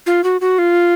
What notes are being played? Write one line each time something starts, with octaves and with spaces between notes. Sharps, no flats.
F4
F#4
F#4
F4